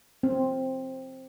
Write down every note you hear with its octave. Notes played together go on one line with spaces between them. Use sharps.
C4